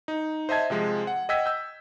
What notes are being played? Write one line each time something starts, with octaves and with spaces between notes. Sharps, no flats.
D#4
C5 D#5 E5 A5 G#6
C3 F3 G#3
F#5
D#5 F#5 G5 E6 G#6 B6
E6 G6